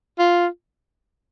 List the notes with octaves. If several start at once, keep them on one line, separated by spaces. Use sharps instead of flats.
F4